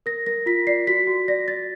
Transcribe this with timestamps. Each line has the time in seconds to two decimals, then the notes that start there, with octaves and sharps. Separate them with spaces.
0.06 A#4 A#6
0.26 A#4 A#6
0.46 F4 B6
0.67 D5 C7
0.87 F#4 B6
1.07 F#4
1.28 D5 A#6
1.48 D5 A6